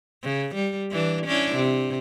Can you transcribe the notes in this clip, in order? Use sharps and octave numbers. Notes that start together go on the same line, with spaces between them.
C#3
G3
E3 D4
C#4 D4 E4
C3